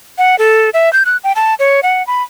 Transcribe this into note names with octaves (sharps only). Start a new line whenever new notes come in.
F#5
A4
E5
G6
F#6
G5
A5
C#5
F#5
B5